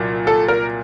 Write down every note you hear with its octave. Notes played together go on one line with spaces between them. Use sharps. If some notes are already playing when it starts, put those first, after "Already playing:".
Already playing: C2 A#2 F#3
A4
A#4